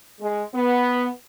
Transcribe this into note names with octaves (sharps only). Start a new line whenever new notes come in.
G#3
B3